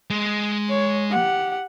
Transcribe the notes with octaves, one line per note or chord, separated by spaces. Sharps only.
G#3
C#5
G4 F#5